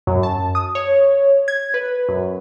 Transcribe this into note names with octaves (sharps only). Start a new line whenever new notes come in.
F#2
A5
D#6
C#5
G#6
B4
F#2